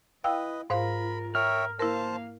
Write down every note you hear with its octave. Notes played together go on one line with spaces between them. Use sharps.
E4 B4 D#5 F5 G5 E6
G#2 F4 A#4 C5 F5 B5
A#4 C#5 E5 G5 F6
A#3 E4 A#4 C5 F5 A5